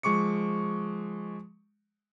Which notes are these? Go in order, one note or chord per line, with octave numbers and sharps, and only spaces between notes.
F3 G#3 C#6 D6 C#7